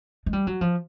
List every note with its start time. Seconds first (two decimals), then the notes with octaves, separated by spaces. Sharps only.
0.26 G#3
0.33 G3
0.47 F#3
0.61 F3